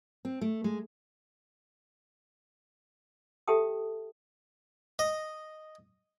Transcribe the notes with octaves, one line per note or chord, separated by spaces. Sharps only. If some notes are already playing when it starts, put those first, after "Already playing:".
C4
A3
G#3
G4 A4 E5 G5 A5 D#6
D#5